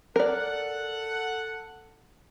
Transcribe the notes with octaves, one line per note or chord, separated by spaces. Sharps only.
A4 A#4 D5 F#5